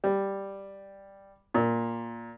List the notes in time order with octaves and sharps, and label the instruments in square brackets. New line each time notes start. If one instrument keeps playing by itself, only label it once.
[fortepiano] G3
A#2